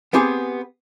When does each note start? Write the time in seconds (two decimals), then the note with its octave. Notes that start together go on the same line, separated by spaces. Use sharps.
0.13 B3 C4 G4 G#4 G#5